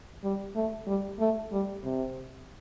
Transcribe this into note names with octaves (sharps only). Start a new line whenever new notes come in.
G3
A3
G3
A3
G3
C3